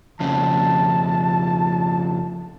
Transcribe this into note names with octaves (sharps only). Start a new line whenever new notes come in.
F2 C#3 A5